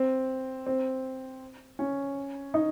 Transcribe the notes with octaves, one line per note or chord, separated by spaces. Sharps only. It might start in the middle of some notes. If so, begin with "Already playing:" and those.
Already playing: C4
C4
C#4
D#4